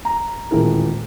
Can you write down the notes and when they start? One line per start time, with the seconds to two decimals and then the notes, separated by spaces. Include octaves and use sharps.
0.05 A#5
0.51 D#1 E2 A2 G#3 A#4